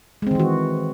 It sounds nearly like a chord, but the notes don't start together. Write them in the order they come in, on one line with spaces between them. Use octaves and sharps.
G#3 C4 D#3 E3 F#4